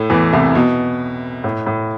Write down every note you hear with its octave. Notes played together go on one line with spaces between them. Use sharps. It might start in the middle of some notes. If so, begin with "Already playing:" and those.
Already playing: A2 A3
E2 E3
C2 C3
B2
A2
A2